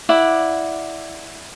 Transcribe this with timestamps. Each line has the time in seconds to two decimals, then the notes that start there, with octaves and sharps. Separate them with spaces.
0.09 E4 D5 F#5